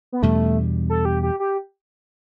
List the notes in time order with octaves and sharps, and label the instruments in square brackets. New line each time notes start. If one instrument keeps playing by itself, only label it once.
[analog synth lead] B3
[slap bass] E2 B2 G3 D4 [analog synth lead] A3
[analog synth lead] A4
G4
G4
G4